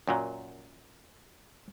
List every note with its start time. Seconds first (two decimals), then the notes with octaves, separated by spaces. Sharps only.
0.08 F#2 A#2 F#3